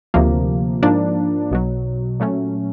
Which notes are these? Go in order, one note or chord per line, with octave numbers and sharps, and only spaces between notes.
D2 C3 F3 A#3
G#2 F3 A#3 D4
B1 B2 F#3
A#2 F#3 A3 C#4